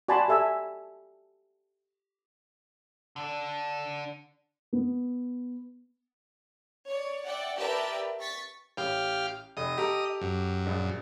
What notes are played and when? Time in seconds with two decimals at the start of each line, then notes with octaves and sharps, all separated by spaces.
0.08 F#4 D5 G#5 A5 B5 C6
0.28 G4 A4 E5 G#5 E6
3.16 D3 D4
4.73 B3
6.88 C#5 D5
7.25 D5 E5 F#5 G5
7.57 G4 A#4 B4 D5 E5 A5
8.20 C#6 A6 B6
8.77 A1 G4 F5
9.57 F1 D#5
9.78 G4 A4 A#5
10.21 F#2
10.67 A#1